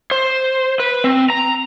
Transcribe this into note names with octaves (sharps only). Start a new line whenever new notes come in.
C5
B4
C4
A#5